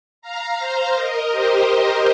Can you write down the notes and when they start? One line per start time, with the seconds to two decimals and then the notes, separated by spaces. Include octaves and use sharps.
0.22 F5 A#5
0.59 C5 F5
0.95 A#4 D#5
1.31 G4 C5